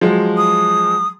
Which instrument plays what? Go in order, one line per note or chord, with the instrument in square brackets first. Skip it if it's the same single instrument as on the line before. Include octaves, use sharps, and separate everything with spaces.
[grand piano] F3 F#3 G#3
[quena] D#6